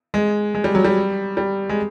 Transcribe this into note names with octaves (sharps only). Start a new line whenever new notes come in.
G#3
G#3
G3
F#3
G3
G3
G#3